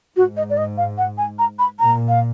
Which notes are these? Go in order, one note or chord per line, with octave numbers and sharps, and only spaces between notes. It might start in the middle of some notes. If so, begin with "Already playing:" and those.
G#2 F#4
D#5
D5
D#5
F5
F#5
G#5
A#5
B5
A#2 A#5
F5